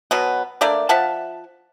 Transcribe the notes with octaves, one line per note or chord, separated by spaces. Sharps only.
B2 F#3 B3
A3 A#3 D4 D5
F3 E5 F#5 A5